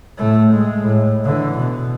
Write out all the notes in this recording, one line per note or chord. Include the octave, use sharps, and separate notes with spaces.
A2 A3
G#3
A2
D3 E3
B2